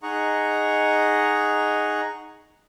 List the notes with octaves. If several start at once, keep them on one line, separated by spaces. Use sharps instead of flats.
D#4 G#4 D#5 F#5 A#5 C#6